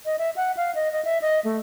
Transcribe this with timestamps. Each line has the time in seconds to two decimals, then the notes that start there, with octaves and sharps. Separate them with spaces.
0.05 D#5
0.19 E5
0.36 F#5
0.57 F5
0.75 D#5
0.92 D#5
1.05 E5
1.22 D#5
1.45 A3